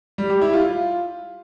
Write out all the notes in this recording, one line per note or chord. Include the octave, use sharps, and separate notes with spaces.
G3
G4
E4
F4